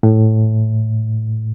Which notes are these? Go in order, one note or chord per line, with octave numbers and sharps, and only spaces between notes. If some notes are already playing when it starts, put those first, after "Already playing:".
A2